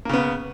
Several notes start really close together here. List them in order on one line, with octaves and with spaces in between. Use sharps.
A#3 C#3 B3